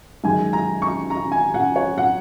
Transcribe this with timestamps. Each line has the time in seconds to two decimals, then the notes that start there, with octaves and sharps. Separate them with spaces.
0.24 F#2 D#3 G#3 G#5
0.53 A#5
0.82 C#6
1.10 A#5
1.32 G#5
1.54 F#5
1.76 C#5
1.98 F#5